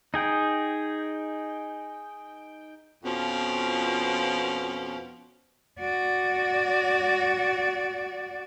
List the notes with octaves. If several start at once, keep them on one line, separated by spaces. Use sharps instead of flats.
D#4 G#4 G5
F2 B2 F3 C#4
F#4 D5